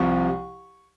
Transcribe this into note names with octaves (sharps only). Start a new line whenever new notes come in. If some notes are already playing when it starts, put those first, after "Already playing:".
Already playing: C2 C3 F3 C#6